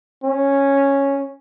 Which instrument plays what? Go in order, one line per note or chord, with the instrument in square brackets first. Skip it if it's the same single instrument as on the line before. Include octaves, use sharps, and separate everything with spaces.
[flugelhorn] C#4